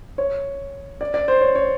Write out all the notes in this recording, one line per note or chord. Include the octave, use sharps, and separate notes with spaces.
C#5
D5
D5
C5
C#5
C#5